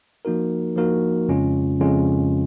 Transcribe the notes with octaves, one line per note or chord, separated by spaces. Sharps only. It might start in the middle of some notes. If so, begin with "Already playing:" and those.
F3 A#3 D#4 F#4 A#4
F3 A#3 D#4 F#4 A#4
F2 C#3 G#3 C#4 F4
F2 C#3 G#3 C#4 F4